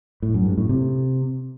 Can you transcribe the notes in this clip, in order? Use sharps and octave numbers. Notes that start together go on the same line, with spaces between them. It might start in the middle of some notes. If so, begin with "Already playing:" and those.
A2
F#2
G2
A2
C3